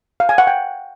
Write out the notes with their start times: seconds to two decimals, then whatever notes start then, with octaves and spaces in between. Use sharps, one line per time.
0.20 F5
0.29 G#5
0.38 F#5
0.47 G5